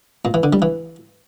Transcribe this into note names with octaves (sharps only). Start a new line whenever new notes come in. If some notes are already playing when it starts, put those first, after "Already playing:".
A#2
E3
D3
G3
E3